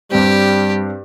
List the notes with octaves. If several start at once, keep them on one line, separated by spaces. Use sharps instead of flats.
G2 G3 C4 G4